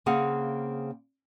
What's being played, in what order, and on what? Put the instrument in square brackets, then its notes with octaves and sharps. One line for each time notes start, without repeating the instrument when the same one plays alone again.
[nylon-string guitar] C#3 A#3 C4 G#4 F5 F#5